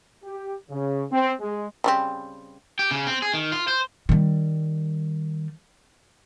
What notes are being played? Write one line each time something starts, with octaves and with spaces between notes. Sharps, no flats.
G4
C#3
C4
G#3
C#3 G3 C4
G4
C#3
C4
G#4
D#3
F4
C5
D#3 G3